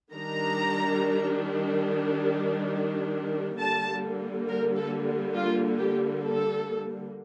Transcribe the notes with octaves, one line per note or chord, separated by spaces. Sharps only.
D#3 G3 D4 A#5
D3 G3 A#3 A5
A#4
A4
F4
G4
A4